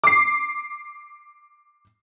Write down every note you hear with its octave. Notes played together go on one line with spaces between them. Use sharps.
D6 C7